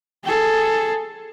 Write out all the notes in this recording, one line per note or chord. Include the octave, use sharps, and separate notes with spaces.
G#4 A4